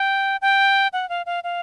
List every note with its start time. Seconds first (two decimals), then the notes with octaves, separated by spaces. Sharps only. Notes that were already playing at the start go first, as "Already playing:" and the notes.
Already playing: G5
0.42 G5
0.93 F#5
1.09 F5
1.26 F5
1.44 F5